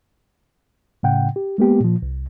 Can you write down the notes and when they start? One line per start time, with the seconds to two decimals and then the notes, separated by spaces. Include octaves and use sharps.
1.03 A2 C#3 F#5 G5
1.36 G4
1.58 G#3 A#3 B3 G4
1.80 A#2 F3
2.02 C2